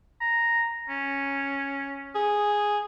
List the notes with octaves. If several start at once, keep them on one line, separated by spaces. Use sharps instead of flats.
A#5
C#4
G#4 D#6